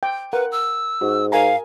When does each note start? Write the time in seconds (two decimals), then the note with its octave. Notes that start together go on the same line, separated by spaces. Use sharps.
0.03 G5
0.33 A#4 B4 F#5
0.52 E6
1.01 G#2 F#4
1.32 A#4 F5 G#5 A#5